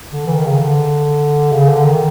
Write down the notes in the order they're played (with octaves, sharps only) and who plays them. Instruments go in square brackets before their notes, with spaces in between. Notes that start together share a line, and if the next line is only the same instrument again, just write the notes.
[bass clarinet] D3
E3
D#3
C#3
D3
C#3
D3
D#3